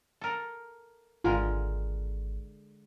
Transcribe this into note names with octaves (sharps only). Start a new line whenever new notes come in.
A4 A#4
G#1 D3 G#3 F4 A#4